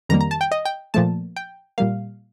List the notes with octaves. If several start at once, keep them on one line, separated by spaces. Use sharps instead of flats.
F2 D#3 G3 A#3 A#5
A#5
A5
G5
D#5
G5
A#2 F3 A3 A5
G5
A#2 G3 A#3 F5